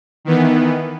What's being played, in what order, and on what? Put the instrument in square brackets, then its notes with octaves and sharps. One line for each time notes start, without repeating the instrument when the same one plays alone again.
[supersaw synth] D#3 E3 B3